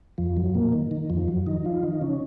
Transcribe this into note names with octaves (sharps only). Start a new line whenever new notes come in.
F2 F3
F#2 F#3
A#2 A#3
D#3
D#3
F2 F3
F#2 F#3
D#3 D#4
F3 F4
D#3 D#4
C#3 C#4